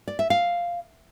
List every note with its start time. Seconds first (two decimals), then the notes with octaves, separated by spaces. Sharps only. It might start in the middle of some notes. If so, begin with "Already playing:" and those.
0.08 D5
0.19 E5
0.30 F5